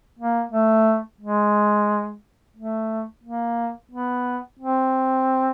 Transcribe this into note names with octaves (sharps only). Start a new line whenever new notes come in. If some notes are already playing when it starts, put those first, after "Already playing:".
A#3
A3
G#3
A3
A#3
B3
C4